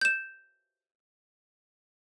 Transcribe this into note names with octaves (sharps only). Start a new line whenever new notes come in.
G6 E7